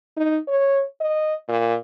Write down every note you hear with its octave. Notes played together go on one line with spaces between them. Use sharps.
D#4
C#5
D#5
A#2